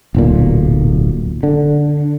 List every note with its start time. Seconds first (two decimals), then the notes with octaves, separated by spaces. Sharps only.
0.15 D1 B1 A#2
1.43 D3